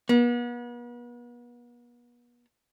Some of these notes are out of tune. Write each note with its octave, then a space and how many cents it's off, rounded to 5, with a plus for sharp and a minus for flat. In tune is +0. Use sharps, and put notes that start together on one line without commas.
B3 -40